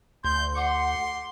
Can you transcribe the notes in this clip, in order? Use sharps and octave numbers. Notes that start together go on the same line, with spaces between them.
D2 C6 G6
F#5 C6 D6